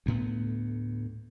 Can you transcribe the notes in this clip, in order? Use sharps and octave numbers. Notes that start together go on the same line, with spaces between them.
D2 A2 B3